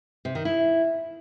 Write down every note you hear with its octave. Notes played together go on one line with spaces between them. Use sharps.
C3
D#3
E4